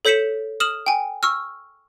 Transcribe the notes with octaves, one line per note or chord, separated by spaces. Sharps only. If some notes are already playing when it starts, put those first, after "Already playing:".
A4 C#5 G6 B6 C#7 E7
D#6 F6 E7 F#7
G5 G#5
C#6 E6 F6